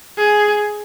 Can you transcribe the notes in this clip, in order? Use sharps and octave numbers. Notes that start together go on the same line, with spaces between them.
G#4